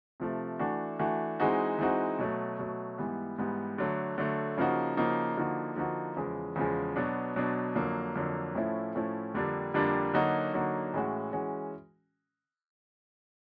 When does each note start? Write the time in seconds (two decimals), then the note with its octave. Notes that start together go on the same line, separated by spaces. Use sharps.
0.20 C3 F3 A3
0.59 E3 A3 D4 F#4
0.99 E3 A3 D4 F#4
1.40 E3 G#3 C4 D#4 F#4
1.79 E3 G#3 C4 D#4 F#4
2.19 B2 F#3 A3
2.59 B2 F#3 A3
2.98 G#2 E3 G3 B3
3.38 G#2 E3 G3 B3
3.78 D3 F#3 A3
4.18 D3 F#3 A3
4.57 C#3 F3 A#3 D#4 F#4
4.97 C#3 F3 A#3 D#4 F#4
5.37 D3 F3 A#3 D#4 F#4
5.76 D3 F3 A#3 D#4 F#4
6.17 E2 C#3 F3 G#3
6.56 E2 C#3 F3 G#3
6.96 B2 F#3 B3 D4
7.36 B2 F#3 B3 D4
7.76 F2 D3 F#3 A#3
8.16 F2 D3 F#3 A#3
8.55 A2 F3 A3 C#4 E4
8.95 A2 F3 A3 C#4 E4
9.34 F2 D3 G3 A#3 D4
9.74 F2 D3 G3 A#3 D4
10.13 D3 F#3 A#3 D#4 F#4
10.54 D3 F#3 A#3 D#4 F#4
10.94 A2 E3 G#3 C#4 F#4
11.33 E3 G#3 C#4 F#4